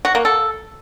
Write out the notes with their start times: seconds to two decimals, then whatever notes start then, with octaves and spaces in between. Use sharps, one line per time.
0.05 F#4
0.15 A#3
0.25 A4